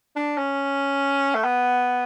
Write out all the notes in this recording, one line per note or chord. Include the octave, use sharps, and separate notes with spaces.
D4
C#4
A3
B3